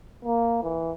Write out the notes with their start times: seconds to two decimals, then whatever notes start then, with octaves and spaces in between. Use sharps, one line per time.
0.25 A#3
0.63 E3